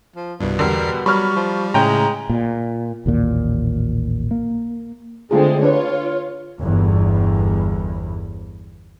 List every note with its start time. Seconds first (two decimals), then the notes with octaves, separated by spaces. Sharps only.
0.16 F3
0.41 C2 G2 B2
0.59 E2 D3 G3 A#4 C7
1.06 F#3 G3 B5 C#6 F6
1.36 F3
1.74 A2 C#3 G#3 G5 A#5
2.29 A#2
3.06 A1 D#2 A#2
4.31 A#3
5.31 D3 G#3 A3 C4 F4 G#4
5.63 D4 F4 B4 C#5
6.62 G1 E2